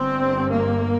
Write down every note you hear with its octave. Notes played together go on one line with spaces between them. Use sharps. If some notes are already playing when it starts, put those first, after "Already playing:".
Already playing: G1 G2 C4
A#3